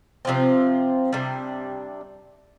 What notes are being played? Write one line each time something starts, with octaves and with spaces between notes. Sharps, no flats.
C3 F3 C4 F4
C3 G3 D4